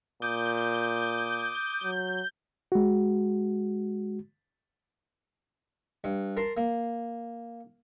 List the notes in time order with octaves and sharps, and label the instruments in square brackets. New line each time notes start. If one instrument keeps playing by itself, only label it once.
[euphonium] A#2 [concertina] D6 D#6 [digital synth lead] G6
[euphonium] F#3
[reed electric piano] G#3 F#4
[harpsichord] G2
A#4 A5 C6
A#3